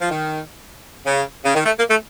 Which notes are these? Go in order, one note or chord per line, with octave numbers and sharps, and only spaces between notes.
F3
D#3
C#3
C#3
D#3
A3
A#3
A3